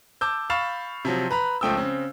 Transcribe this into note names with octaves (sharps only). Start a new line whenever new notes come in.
A5 D6 E6 G6
F5 B5 C#6 A6 E7
C3 F3 F#3
B4 A#5 B5
C#2 F3 A3 G5 D#6 E6
C#3 C4